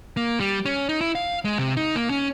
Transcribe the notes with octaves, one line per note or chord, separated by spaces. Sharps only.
A#3
G3
C#4
D#4
E4
F5
G#3
C3
D#4
A#3
C#4